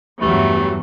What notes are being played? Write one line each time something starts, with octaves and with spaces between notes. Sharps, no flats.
E2 G2 E3 F#3 A3 G4